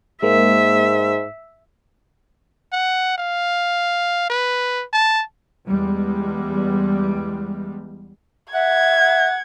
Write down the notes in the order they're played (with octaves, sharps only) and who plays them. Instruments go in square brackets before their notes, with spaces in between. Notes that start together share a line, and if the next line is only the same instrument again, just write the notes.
[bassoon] G#2 [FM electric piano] G#3 A#3 [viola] E5
[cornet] F#5
F5
B4
A5
[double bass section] E2 G3 G#3
[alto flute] E5 [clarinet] F#5 [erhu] G#6
[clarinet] F#5